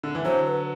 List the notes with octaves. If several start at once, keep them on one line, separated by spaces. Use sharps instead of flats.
D3
E3
D3 F#3 C5
B4